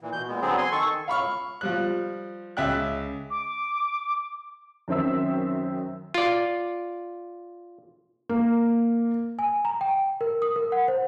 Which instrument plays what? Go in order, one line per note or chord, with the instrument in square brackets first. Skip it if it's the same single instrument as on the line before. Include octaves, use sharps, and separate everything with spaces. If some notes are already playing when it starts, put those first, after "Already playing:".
[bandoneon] A#2 E3
B2 G6
A#2 G#3 B3
D3 F#3 B3 C4 G#4
G#5 C6
D#3 A4 C#6
[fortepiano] F5 B5 C#6 F6
F3 G3 F#6
C#2 E5 G5 F#6
[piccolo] D6
[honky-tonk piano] F#2 D#3 C4 E5 E6
[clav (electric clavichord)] F4 D5
[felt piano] A#3
[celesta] G#5
A#5
G5
A#4
D#6
A#4
F#5
C5